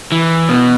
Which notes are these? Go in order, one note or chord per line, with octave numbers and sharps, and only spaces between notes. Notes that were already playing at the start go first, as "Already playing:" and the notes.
E3
B2